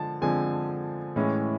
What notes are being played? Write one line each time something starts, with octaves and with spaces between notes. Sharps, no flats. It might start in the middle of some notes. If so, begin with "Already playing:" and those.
Already playing: D3 F3 G#3 A5
D3 F3 G#3 C4 G#5
A2 E3 G#3 C#4